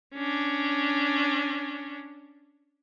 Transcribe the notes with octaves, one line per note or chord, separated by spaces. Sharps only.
C#4 D4